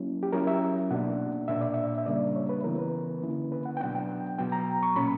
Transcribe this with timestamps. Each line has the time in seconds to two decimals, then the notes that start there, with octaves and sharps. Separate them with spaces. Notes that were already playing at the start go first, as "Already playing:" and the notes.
Already playing: F#3 A#3 C#4 E4
0.23 G4
0.33 F#3 C#4 E4 A#4
0.47 E5
0.91 B2 A#3 D4 F#5
1.48 A#2 A#3 D4 E5
1.61 D5
1.74 E5
1.98 E5
2.06 C#3 G3 A#3 D4 D5
2.36 C#5
2.49 B4
2.64 C#3 E3 B3 E4 A#4
2.79 B4
3.22 D3 A#3 C#4 E4
3.52 B4
3.65 F#5
3.77 G5
3.80 B2 F#3 B3 D4 F#5
3.95 G5
4.38 B2 F#3 B3 G5
4.52 A#5
4.83 C#6
4.96 A#2 A#3 C#4 B5